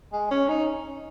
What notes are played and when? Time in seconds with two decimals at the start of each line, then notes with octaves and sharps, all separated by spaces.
0.13 G#3
0.31 C#4
0.49 D#4